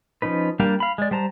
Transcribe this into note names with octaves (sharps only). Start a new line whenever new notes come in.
F3 C#4 D#4 B4
G3 A#3 D4 G4 F5
F5 B5
G#3 D5
G3 C5 A5 A#5